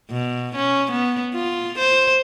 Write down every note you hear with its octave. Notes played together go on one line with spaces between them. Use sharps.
B2
C#4
B3
F4
C5